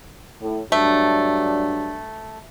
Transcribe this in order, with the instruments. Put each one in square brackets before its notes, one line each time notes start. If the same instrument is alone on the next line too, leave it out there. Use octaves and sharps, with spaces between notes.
[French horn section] A2
[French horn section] G2 F#3 D4 [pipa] A3